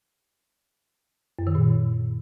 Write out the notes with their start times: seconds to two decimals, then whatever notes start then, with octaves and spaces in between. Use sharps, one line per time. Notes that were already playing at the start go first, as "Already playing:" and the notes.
1.39 F#2
1.47 D#3
1.55 A#2